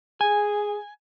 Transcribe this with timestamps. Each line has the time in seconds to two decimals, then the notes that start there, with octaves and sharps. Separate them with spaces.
0.21 G#4 G#5